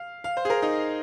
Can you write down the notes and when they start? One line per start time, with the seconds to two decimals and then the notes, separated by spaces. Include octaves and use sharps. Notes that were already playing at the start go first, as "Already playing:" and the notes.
Already playing: F5
0.24 F5
0.37 C5
0.45 G#4
0.50 A#4
0.62 D#4